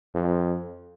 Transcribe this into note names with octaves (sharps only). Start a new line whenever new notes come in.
F2